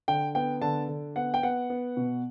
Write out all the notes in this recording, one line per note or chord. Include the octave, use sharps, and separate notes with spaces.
D3 G5
B3 G5
D3 A5
D3
B3 F#5
G5
B3 F#5
B3
B2